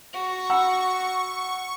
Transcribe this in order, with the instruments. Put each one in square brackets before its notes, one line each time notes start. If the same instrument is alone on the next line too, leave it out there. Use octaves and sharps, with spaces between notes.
[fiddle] F#4 [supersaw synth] C#6
[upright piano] F#5 B5 E6